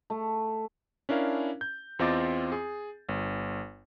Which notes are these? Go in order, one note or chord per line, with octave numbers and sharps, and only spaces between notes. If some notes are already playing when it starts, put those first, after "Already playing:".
A3
C#4 D4 E4 A#4 F5
G6
E2 C4 F4 D#5 D6 A6
G#4
G1